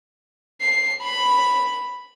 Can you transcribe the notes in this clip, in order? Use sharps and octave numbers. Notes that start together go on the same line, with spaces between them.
C7
B5